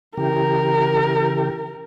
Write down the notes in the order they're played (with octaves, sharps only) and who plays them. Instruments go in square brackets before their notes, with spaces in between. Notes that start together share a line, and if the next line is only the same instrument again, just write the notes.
[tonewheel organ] C#3 E3 G4 [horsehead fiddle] A#4